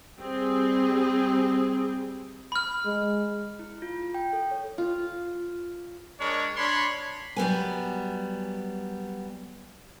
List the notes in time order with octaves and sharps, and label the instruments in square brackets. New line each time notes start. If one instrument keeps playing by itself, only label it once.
[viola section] G3 C4 G#4
[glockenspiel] B5 F6
[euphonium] G#3
[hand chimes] E4
F4
G5
A4
C#5
[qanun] F4
[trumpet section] G#3 D4 A#4 C#5
D4 C#5 B5 C6
[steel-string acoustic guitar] F#3 G3 B3 G#5